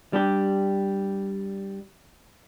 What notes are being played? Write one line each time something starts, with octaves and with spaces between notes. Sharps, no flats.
G3 D4 G4